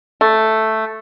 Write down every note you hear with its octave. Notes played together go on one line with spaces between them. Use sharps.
A3